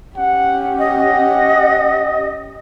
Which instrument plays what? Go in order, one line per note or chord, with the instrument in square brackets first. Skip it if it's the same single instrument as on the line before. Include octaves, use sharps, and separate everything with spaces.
[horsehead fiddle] C#4 G4 [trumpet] F#5
[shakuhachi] D#5 [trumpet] F#5